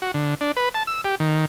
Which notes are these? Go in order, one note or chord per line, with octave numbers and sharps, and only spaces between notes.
F#4
D3
D4
B4
A5
E6
G4
D#3